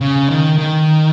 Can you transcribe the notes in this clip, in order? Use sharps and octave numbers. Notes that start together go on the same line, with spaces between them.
C#3
D#3
D#3